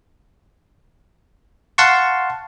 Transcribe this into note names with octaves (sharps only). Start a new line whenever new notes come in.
F5 F#5 A5 C6 C#6